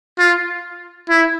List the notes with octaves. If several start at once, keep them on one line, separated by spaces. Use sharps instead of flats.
F4
E4